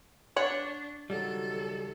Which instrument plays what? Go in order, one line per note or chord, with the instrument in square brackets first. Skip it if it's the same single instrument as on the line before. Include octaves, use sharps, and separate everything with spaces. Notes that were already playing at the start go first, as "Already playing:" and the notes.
[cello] D4 [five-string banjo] C#5 F#5
[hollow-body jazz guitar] C#2 F#3 G3 [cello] D#3 A4